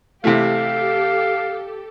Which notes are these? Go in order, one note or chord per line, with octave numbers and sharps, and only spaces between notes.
C3 E3 A3 G4 A4 F5